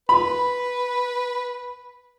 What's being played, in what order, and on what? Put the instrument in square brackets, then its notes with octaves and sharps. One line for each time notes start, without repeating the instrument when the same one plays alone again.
[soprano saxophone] B4 [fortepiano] B5